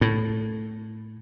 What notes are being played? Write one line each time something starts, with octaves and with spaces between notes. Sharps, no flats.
A2